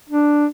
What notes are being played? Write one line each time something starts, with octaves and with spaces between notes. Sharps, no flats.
D4